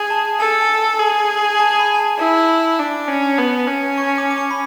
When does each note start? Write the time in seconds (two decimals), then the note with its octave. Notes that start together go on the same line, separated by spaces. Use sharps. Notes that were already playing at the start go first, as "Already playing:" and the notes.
Already playing: G#4
0.10 A5
0.40 A4 G#5
0.61 G#5
0.99 G#4
1.59 A5
1.79 B5
1.94 G#5
1.98 A5
2.19 E4 A5
2.48 B5
2.79 D4
3.08 C#4
3.38 B3
3.67 C#4
3.98 C#6
4.18 D6
4.31 D6
4.38 C#6
4.51 B5